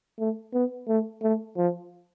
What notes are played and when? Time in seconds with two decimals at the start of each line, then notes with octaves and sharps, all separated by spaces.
0.19 A3
0.54 B3
0.88 A3
1.23 A3
1.57 F3